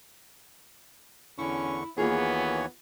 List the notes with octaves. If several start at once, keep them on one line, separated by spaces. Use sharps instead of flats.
E2 D3 C#4 E4 C#6
D#2 E3 A#3 B3 F4 G#4 C#5